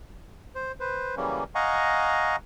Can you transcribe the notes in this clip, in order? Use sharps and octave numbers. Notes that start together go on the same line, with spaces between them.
C5
B4 C5
C#3 E3 F#3 G3 A#3 C#4
D#5 F5 F#5 G#5 A#5 C#6